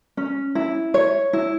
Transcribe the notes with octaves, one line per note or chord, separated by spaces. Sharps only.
C#4
E4
C#5
E4